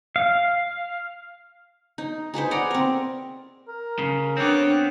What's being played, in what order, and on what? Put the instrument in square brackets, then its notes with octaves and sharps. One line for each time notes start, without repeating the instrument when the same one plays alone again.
[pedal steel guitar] F5
[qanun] D#4
D#4 G#4 B4 C5
D5 F#5 G#5 A#5
C4 A#4
[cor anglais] A#4
[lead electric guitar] C#3
[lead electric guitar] B3 C4 [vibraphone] D4 G5 [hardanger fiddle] C#5 D6